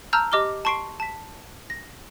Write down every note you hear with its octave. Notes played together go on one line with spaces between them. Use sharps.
A5 A#5 E6 F6 G6
G4 D#5 D6 F6 G7
A5 C6 C#6 C7 D7
A5 B6
A#6